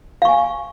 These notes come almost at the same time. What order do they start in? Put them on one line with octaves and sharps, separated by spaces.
F5 C#6 G#5